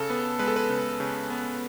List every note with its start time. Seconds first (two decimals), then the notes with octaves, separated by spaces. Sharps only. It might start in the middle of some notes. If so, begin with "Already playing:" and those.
Already playing: C#3 A4
0.10 B3
0.39 G#3 B4
0.48 A4
0.56 B4
0.70 C#3
1.00 C#3
1.30 B3